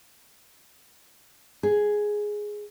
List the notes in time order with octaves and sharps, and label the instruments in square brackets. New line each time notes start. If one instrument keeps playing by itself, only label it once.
[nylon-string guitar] G#4